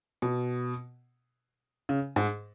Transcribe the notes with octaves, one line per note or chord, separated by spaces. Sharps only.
B2
C#3
G#2